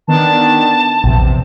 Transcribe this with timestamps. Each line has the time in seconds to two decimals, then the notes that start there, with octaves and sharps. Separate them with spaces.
0.08 D#3 B3 D4 A5
1.04 A#1 E2 C3